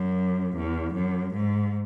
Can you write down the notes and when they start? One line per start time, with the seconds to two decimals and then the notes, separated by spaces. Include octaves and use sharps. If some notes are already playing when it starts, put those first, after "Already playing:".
Already playing: F#2
0.55 E2
0.93 F#2
1.33 G#2